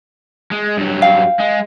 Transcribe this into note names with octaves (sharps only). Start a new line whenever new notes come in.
G#3
G2 F#3
F5 G5
G#3